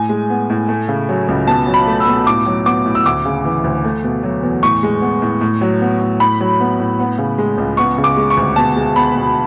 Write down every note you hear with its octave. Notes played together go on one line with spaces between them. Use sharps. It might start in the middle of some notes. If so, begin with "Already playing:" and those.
Already playing: A2 G#5
G#3
B3
A2
A3
C#3
F#3
C#2
B2 A5
F#3
B5
A3
E6
B2
A2 D6
F#3
B3 D6
A2
E6
D2 D6
C#3
E3
D2
A3
B2
F#3
E2
A2 C#6
G#3
B3
A2
A2
F#3
B3
A2
A2 B5
F#3
B3
A2
B3
C#3
G#3
C#2
B3 C#6
C#3
D6
G#3
C#6
D2
B2 A5
G#3
B3 B5
B2